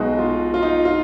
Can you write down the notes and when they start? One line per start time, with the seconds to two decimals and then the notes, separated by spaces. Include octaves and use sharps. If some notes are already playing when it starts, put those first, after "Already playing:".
Already playing: B1 B2 G#3 D#4 F#4
0.19 F4
0.54 F4
0.63 D#4
0.85 F4